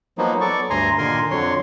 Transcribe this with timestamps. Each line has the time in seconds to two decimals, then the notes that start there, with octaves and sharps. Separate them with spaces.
0.18 F3 F#3 A#3 B3 D#4
0.41 F#3 B3 A4 D5 C#6
0.70 D2 G2 G#5 A#5 C6
0.98 A#2 D3 D#3 A#4 G#5 C6
1.31 F2 D3 F#3 C#5 C6